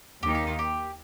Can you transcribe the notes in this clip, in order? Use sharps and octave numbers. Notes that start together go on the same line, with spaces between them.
D#2 D#3 A#3 D#4 G4
G4
F4
G4